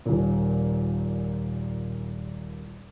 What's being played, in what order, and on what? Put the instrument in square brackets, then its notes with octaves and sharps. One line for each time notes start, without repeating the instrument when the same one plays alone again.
[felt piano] D#1 A#2